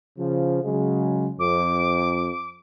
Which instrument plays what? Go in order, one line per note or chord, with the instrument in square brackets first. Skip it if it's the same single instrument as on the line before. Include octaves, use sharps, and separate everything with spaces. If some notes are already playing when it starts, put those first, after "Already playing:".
[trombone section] C#3 F3
C#3 F#3 G#3
[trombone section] F2 [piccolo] D6